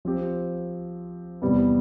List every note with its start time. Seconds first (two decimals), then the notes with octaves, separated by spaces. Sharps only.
0.05 F3 C4 G4
1.42 E2 C3 G3 B3